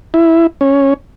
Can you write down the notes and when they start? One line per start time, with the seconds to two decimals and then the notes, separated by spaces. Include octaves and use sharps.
0.14 E4
0.61 C#4